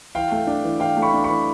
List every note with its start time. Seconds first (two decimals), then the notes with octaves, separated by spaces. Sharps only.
0.15 E3 F5 G5
0.31 A3
0.47 D4
0.64 E3
0.80 E3 F5 G5
0.97 A3
1.02 B5 C#6
1.14 D4
1.24 B5 C#6
1.29 E3